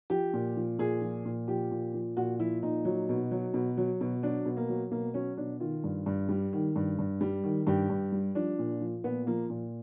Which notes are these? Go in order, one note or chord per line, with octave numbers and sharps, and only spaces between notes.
F3 G4
A#2
F3
A#2 G#4
F3
A#2
F3 G4
A#2
F3
A#2 F#4
F3 E4
A#2 D#4
F#3
B2
F#3
B2
F#3
B2
F#3 D4
B2
A#3
F#3
B2 A#3
F#3 C#4
B2 D4
D#3 F4
G2
G2
G3
D#3
G2
G2
G3
D#3
G2 G4
G2
G3
F3 D4
A#2
F3
A#2 B3
F3 A#3
A#2